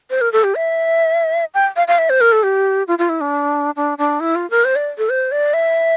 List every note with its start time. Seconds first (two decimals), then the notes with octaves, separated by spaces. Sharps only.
0.10 C5
0.21 A#4
0.33 A4
0.44 G4
0.55 E5
1.54 G5
1.76 F5
1.88 F5
1.98 E5
2.10 C5
2.21 A#4
2.32 A4
2.43 G4
2.88 F4
2.99 F4
3.09 E4
3.21 D4
3.76 D4
3.98 D4
4.20 E4
4.35 F4
4.50 A#4
4.65 C5
4.76 D5
4.98 A4
5.09 C5
5.32 D5
5.54 E5